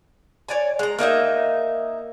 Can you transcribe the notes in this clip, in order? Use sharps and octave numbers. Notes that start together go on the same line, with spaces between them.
C#5 D5 G#5
G#3 A#5
A#3 D#4 D#5 E5